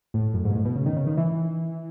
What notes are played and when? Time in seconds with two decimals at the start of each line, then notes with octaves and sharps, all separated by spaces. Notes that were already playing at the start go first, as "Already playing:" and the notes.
0.14 A2
0.34 F#2
0.45 G#2
0.50 B2
0.55 A2
0.65 B2
0.75 C#3
0.86 D#3
0.96 C#3
1.07 D#3
1.17 E3